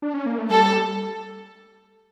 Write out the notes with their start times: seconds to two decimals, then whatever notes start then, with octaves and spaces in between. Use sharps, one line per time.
0.02 D4
0.14 C#4
0.26 A#3
0.38 A3
0.50 G3 A4